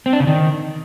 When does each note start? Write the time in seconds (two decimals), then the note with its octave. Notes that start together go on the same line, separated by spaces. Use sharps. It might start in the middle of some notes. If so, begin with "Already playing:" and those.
0.06 C4
0.13 D4
0.20 C#3
0.27 D#3